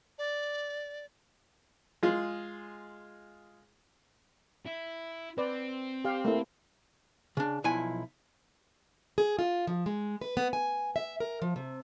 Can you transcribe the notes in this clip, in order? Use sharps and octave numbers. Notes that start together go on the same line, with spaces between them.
D5
G#3 F4 G#4
E4
C4 B4 D5
G4 F5
A3 A#3 E4
C#3 D4
B1 F3 E4 G#5
G#4
F4
F3
G#3
B4
B3
G#5
E5
A#4
F3
C3